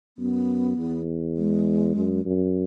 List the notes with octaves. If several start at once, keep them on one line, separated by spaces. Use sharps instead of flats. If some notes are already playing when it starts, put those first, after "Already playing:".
F#2 B3
E2
G#3
F#2
F#2